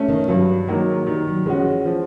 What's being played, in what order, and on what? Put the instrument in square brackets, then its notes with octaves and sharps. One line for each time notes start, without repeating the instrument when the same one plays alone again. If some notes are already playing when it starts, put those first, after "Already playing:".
Already playing: [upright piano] A3 C#4
[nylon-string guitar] D#3
[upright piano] G2 [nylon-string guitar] F#3
[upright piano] D#3 F#3 A#3 [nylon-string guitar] G#3
[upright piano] D#3 [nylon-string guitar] G3
[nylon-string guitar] F#3
[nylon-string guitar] F3 [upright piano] G#3 C#4 F#4
[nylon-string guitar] F3
E3
[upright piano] F3